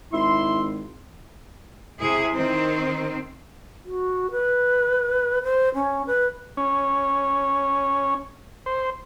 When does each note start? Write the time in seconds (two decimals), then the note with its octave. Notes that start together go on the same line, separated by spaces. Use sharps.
0.13 G#1 E4 C6
2.00 C3 E4 G#4
2.34 D#3 C4
3.85 F#4
4.31 B4
5.43 C5
5.75 C#4
6.07 B4
6.57 C#4
8.66 C5